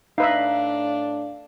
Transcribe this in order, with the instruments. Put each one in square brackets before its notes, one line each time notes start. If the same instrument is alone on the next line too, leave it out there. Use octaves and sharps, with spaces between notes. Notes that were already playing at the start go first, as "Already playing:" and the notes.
[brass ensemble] A2 D4 [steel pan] D#4 B4 E5 [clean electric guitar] F5